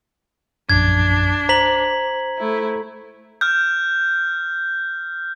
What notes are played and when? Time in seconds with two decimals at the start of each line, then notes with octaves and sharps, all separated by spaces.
0.70 A#1 F#2 D4 G#6
1.49 C5 A#5 B6 F#7
2.38 A3 E4
3.41 F6 G6